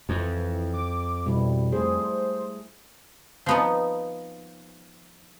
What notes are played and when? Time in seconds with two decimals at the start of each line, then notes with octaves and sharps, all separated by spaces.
0.09 F2 E3
0.74 D6
1.26 B2 G3 E4
1.72 A3 G#4 C5
3.46 F3 B3 D#4